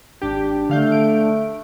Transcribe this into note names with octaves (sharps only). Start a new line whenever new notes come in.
G#1 D4 G4
D3 A3 F5 G6
D7